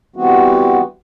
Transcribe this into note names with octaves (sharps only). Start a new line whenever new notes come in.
E3 G3 B3 C4 F#4